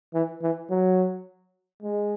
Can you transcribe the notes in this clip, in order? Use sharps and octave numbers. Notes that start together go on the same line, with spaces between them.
E3
E3
F#3
G#3